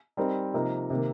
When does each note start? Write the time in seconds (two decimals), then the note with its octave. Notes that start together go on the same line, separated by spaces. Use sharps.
0.17 G3 C4 D#4 A#4
0.54 C3 F3 A#3 D#4 A#4
0.90 C3 D#3 A#3